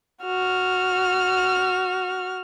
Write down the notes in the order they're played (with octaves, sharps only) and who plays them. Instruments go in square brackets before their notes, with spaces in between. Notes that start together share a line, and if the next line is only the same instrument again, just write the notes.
[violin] F#4 F6